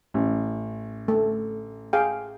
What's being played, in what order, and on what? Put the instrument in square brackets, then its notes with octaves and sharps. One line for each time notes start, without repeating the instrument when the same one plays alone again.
[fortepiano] A1
[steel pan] A3
G#4 F5 G5